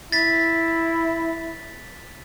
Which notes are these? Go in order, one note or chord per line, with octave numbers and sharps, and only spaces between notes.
E4 A6 B6